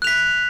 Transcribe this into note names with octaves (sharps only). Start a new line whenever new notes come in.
F#6 B6 F7